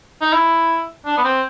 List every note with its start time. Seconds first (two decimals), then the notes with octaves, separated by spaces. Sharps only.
0.21 D#4
0.33 E4
1.06 D4
1.17 B3
1.24 C4